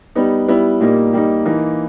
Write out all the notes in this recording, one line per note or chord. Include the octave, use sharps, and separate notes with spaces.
G3 B3 D#4
G3 B3 E4
A#2 G3 A#3 D#4
G3 A#3 D#4
E3 A#3 D#4